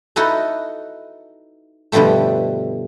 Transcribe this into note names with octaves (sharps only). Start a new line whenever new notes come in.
D#4 E4 F#4 A4 B4 D#5
G2 B2 D3 F3 G3 A3